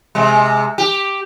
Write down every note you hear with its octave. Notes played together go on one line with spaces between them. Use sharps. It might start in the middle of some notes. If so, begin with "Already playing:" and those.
C3 G#3
G4